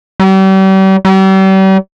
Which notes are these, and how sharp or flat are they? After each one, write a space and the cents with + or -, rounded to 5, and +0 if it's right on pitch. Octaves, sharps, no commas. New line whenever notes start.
G3 -40
G3 -40